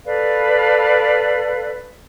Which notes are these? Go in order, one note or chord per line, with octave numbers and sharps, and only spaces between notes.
A4 B4 D5 F5